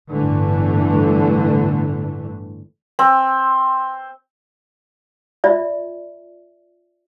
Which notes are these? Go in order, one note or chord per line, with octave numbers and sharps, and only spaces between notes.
G1 A2 D3 E3 A3
C4
F4 D5 E5